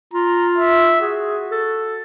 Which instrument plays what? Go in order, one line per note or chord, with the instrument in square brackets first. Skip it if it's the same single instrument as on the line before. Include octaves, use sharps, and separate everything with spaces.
[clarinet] F4 [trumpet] A#5
[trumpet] E5
[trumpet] F#4 [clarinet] G#4
[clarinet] A4